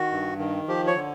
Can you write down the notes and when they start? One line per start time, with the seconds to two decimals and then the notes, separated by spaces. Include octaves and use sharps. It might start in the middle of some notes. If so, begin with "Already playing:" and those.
Already playing: D#3 F#4
0.12 G2
0.39 D#3
0.68 F3 G4
0.87 C#5
0.96 D3